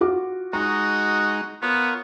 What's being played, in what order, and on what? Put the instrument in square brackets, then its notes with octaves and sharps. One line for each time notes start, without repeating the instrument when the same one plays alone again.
[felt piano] F4 F#4 D6
[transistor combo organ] G#3 D#4 [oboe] F#4 [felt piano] A#5
[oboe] B3 [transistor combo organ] F4 A#4 C#5